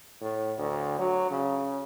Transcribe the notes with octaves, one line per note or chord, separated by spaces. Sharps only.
A2
D2
F#3
C#3